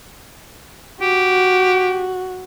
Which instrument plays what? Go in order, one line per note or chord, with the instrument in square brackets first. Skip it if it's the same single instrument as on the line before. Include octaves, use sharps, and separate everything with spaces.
[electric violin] F#4 [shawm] G4